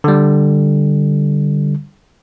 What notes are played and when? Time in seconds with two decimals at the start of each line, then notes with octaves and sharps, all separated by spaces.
0.04 D3 G3